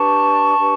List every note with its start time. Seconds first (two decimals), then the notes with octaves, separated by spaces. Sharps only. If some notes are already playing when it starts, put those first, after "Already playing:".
Already playing: D4 G4 B4 A5 C#6
0.57 D4 G4 B4